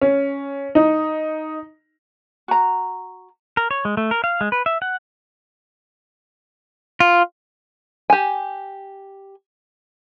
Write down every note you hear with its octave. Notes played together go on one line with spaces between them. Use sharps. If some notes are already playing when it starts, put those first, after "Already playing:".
C#4
D#4
F#4 A#5
A#4
C#5
G#3
A3
A#4
F5
G#3
B4
E5
F#5
F4
G4 G#5